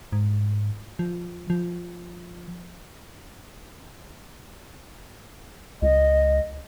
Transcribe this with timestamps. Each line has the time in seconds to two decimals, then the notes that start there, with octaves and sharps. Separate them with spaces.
0.12 G#2
0.99 F3
1.50 F3
5.82 C#2 D#5